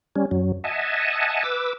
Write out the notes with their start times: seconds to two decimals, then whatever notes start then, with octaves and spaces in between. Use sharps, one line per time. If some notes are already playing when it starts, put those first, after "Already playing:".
0.16 G3 C#4
0.31 F#2 F#3
0.64 D#5 E5 F#5 G#5 A5
1.44 B4 D6 E6